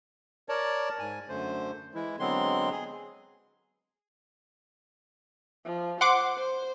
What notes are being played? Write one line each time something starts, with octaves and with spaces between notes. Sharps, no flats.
A#4 C#5 D5 A5
G#2 G#5
F#2 D3 A3 C5
E3 G#3 E4
D3 F#3 G#3 B3 C4 C6
G#4
F3
C5 F#5 C6 D6
C5